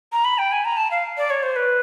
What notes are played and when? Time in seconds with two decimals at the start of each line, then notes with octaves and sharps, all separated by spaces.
0.13 A#5
0.25 B5
0.38 G5
0.52 G#5
0.65 A#5
0.77 A5
0.91 F5
1.17 D5
1.30 C#5
1.43 C5
1.56 B4